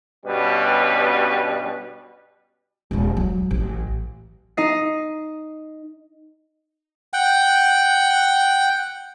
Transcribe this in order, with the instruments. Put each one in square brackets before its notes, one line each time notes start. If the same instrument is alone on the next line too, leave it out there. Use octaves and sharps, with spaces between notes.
[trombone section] G2 B2 G3 C#4 B4
[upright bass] D#1 G#3
F#3
A1
[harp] D#4 D#5 C7
[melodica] F#5 G5